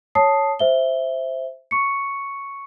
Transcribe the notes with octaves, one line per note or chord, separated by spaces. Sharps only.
C#5 A5 D#6 C7
C5 E5 G7
C#6 C#7